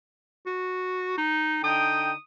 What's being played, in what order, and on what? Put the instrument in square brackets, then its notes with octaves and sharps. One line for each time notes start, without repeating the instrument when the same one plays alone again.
[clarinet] F#4
D#4
[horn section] D3 D#4 G5 [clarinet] D#6